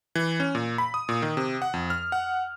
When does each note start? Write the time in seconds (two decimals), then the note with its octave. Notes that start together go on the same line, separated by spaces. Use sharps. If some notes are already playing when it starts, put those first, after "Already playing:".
0.15 E3
0.40 C#4
0.55 A#2
0.78 B5
0.94 D#6
1.09 A#2
1.22 D#3
1.37 C3
1.62 F#5
1.74 F2
1.90 F6
2.12 F#5